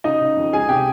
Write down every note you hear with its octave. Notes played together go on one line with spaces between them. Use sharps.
C#3 D#4 D#5
C#3
F2
C#2 G#4 G#5
C3 G4 G5